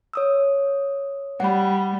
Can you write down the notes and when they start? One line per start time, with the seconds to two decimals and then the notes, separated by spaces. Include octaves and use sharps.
0.13 C#5 D#6 E6
1.40 G3 F#5 B5